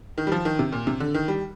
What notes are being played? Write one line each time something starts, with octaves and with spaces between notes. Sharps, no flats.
D#3
G3
F3
D#3
C3
A#2
C3
D3
D#3
G3